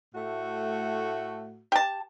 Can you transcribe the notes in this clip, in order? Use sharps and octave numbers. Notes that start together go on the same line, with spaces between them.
A2 A3 F#4
G4 A5